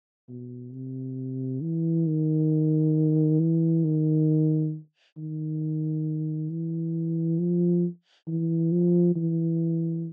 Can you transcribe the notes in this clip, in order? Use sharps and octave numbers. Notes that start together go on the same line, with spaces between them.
B2
C3
E3
D#3
E3
D#3
D#3
E3
F3
E3
F3
E3